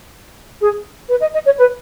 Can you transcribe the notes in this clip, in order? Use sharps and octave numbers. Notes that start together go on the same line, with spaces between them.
G#4
B4
D#5
D#5
C#5
B4